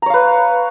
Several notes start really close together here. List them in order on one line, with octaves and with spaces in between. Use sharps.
A#5 C#5 F5 B4